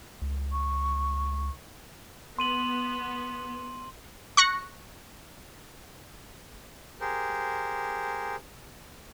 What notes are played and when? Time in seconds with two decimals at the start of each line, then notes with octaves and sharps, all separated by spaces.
0.22 C#2
0.52 C#6
2.39 B3 C6 D#7 F#7
4.37 C#6 F#6 A#6 C#7
7.01 G4 G#4 A#4 C5